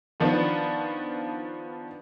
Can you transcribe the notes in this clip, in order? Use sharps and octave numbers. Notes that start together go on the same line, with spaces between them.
D#3 F3 B3 D4